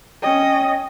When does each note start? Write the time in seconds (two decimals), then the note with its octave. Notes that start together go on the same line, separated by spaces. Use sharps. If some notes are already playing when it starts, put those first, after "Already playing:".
0.23 C#4 D#5 G5